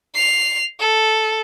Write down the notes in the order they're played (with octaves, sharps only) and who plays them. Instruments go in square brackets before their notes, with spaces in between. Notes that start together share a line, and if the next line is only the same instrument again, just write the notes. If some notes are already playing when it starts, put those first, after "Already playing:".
[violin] C7 F7
A4